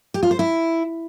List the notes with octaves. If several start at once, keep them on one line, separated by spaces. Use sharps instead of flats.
G4
F4
C5
E4